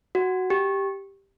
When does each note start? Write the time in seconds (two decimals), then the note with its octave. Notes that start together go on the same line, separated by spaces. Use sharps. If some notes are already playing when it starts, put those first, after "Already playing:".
0.15 F#4
0.50 G4